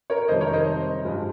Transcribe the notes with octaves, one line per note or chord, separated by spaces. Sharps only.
A#4 C#5
F2 C3 D#3 G3 C5 D#5
A#4 C#5
C5 D#5
G2 F3 G#3